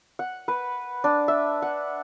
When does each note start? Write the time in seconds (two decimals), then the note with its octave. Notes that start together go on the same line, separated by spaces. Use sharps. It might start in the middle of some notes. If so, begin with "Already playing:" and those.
0.19 F#5
0.48 B4
1.04 D4
1.28 E5
1.62 F#5